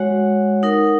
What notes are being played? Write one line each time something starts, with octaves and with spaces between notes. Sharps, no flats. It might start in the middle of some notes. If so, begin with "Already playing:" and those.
Already playing: G#3 F#4 C#5 F#5
D#4 A#4 F#5